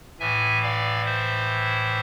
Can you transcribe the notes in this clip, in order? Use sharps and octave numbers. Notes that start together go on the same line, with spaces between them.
A2 E3 E5 G#5
D5 F5
C5 E5